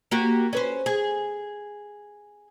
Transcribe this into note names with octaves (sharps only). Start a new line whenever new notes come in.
A#3 F#4 G4
C#4 B4 C5
G#4